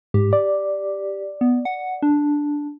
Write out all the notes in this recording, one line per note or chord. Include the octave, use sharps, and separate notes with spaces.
G#2 G4
D5
B3
F#5
D4